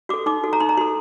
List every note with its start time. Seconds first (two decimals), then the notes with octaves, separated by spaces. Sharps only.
0.09 F#4 A4 D6
0.26 D#4 D6
0.44 F#4 A4
0.53 A#5
0.60 D#4 C6
0.69 A#5
0.77 F#4 A4 C6